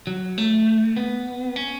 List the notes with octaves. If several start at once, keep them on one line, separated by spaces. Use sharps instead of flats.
F#3
A3
B3
C#4